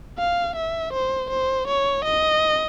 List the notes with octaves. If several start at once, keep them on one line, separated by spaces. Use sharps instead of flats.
F5
E5
C5
C5
C#5
D#5